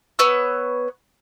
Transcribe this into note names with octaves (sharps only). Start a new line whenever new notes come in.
B3 B4 C#5 E6